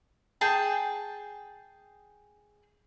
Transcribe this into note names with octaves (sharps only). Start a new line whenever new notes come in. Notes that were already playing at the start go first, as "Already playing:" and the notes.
G#4 G5 A5